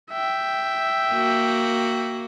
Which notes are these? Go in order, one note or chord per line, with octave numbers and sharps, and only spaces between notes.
E5 G5
A#3 F#4